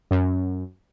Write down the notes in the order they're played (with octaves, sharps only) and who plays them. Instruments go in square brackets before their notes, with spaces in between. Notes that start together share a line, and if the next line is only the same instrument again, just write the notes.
[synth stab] F#2